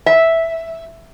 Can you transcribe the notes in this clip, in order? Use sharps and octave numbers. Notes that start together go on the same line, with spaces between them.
E5